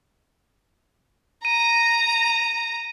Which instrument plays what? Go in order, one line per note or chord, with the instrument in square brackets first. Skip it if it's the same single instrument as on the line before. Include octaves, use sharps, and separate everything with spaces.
[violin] A#5 [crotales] D#7